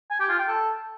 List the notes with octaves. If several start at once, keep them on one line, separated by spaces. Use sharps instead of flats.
G#5
G4
F4
G5
A4